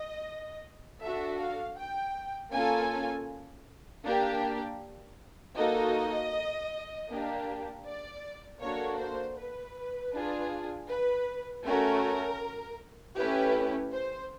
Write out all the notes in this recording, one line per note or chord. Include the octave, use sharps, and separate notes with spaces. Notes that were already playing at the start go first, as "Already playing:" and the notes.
Already playing: D#5
D4 F#4 A4 E5
F5
G5
A#3 C#4 F4 A4 G#5
A#3 D4 G4
A#3 D#4 F#4 A4 D#5
A#3 D4 G4
D5
A#3 D4 F#4 A4 C#5
C5
B4
D4 F4 G#4
B4
A3 C#4 F#4 A#4
A3 C#4 E4 G4 B4
C5